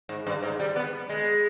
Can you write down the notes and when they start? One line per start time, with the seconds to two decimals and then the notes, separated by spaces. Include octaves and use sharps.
0.09 G#2
0.27 G2
0.43 G#2
0.60 G3
0.76 B3
1.10 G#3